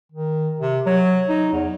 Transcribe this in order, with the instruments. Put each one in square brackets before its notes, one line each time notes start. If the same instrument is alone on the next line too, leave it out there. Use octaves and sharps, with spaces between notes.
[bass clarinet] D#3
C3
F#3
D#4
E2